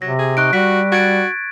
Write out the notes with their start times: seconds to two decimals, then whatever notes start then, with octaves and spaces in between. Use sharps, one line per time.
0.02 C3 F#3 A#6
0.19 G#4
0.37 D#4 C#6 F#6 D7
0.53 G3 F#4 B6
0.92 F#4 G#6 A6 D7